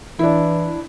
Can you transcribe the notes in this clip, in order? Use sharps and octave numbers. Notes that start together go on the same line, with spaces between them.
E3 D4 E4